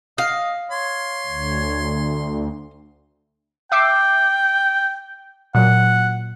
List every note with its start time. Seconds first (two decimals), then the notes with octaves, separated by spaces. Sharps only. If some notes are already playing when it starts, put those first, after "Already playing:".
0.18 D#5 F5
0.71 C#5 C6
1.26 D2
3.72 E5 G5 D6 C7
5.55 A#2 F#3 F#5